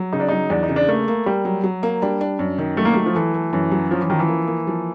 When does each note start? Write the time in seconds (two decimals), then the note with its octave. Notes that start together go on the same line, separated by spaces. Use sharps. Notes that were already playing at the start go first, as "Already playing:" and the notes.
Already playing: F#3
0.13 C#3 D#4
0.20 D4
0.28 F#3 D#4
0.50 E2 D4
0.63 D#4
0.69 C#3
0.76 D4
0.88 A3 A#3
1.08 A#3
1.26 G3 A#3
1.45 F#3
1.64 F#3
1.83 A#3
2.02 G3 D4
2.21 D4
2.39 F#2
2.58 D#3
2.77 F#3 A3
2.85 A#3
2.93 F#3 A3
3.06 F3
3.15 E3 A3
3.34 A3
3.53 F#2 E3
3.72 F#3
3.91 F3 C#4
4.00 E3
4.10 D#3 F3
4.19 E3
4.28 A#3
4.47 A#3
4.67 F3